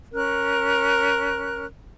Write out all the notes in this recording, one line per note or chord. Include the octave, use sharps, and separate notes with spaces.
C#4 A#4 F#6